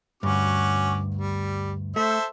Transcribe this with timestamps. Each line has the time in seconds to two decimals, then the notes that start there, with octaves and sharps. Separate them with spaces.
0.23 D2 G2 C#4 F#4 D6
1.14 G3
1.96 A3 A4 C5 E5